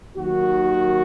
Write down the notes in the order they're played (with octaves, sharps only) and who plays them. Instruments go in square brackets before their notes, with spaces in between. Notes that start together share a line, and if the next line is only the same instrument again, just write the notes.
[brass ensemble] D#2 D#3 F#3 F#4